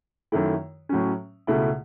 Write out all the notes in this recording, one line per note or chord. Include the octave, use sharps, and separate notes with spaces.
F#2 D#3 A3 E4
A2 F#3 C#4
C#2 B2 A3 E4